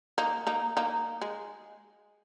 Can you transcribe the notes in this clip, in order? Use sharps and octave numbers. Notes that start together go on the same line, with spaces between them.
A#3 D#4
A#3 D#4
A#3 D#4
G#3